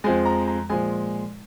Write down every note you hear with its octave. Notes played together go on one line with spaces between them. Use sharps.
F2 F3 G#3 G#5
A#5
A#5
A#2 F3 G#3 G#5